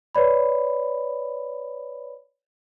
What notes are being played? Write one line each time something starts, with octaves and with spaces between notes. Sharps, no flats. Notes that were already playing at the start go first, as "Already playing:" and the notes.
B4 C#5 D5 B5